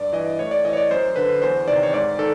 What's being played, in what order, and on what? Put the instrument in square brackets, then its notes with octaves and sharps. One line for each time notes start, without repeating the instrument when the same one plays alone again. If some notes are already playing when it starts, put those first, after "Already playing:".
Already playing: [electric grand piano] G2 D5
E3 D#5
A2 C#5
D5
E3 D#5
C#5
D5
F#2 C5
D3 B4
E2 C5
C3 D#3 D5
C#5
G#2 D5
D#3 A4